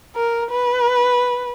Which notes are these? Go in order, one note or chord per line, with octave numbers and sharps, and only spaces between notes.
A#4
B4